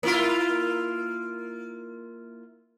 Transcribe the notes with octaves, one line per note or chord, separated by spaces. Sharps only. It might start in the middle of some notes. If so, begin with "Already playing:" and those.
A#3 E4 F4